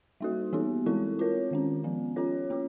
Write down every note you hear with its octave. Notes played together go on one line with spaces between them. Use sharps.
G3 A#3 D#4 F#4 A4
E3 G3 B3 D#4 G4
E3 G#3 C4 E4 A4
C4 F4 A#4 C#5
D#3 G#3 C#4
F3 G#3 B3
C#4 F4 A4 C#5
A#3 C#4 F4